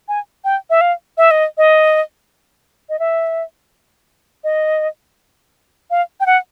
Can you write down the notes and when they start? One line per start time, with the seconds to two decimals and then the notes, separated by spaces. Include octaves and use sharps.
0.08 G#5
0.45 G5
0.70 E5
0.81 F5
1.18 E5
1.31 D#5
1.58 D#5
2.89 D#5
2.99 E5
4.44 D#5
5.91 F5
6.20 G5
6.26 F#5